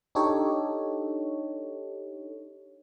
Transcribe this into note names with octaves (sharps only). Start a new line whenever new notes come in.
D4 D#4 G4 A4 C#5